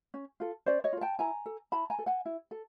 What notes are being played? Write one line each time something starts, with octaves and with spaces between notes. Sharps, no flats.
C#4
F4 A4
C#4 C5 D5
C#5 D#5
F4 A4
G5 A5
E4 G#5 A#5
A4
E4 A5 B5
G#5 A#5
A4
F#5 G#5
E4
A4